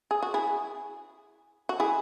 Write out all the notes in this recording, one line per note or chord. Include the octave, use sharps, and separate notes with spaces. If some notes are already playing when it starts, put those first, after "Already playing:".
G#4
F#4
E4 G#4
F#4
E4 G#4